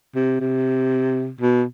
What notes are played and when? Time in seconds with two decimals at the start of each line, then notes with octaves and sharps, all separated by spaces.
0.15 C3
0.40 C3
1.41 B2